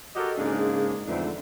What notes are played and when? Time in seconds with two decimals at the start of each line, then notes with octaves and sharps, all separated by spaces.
0.16 F#4 G4 A4 A#4 D#5
0.38 G#2 C#3 G#3 A#3 D4
1.07 F2 G#2 D3 E3 A3 D4